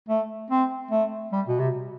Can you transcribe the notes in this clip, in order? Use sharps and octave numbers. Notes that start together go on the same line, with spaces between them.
A3
C4
A3
G3
B2
C3